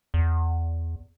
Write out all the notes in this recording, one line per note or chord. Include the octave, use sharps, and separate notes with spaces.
E2